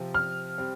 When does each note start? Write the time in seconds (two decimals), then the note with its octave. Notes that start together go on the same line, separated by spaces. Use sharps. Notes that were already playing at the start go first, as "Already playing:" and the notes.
Already playing: C3 F3 C4
0.14 F6
0.58 G3 C4